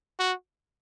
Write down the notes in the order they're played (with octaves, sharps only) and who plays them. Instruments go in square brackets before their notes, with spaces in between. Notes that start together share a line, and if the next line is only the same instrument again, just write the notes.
[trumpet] F#4